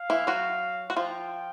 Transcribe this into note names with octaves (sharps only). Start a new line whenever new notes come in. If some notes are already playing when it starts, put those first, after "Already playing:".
Already playing: F5
E3 E4
F#3 F#4
F#4
F3 F4 G5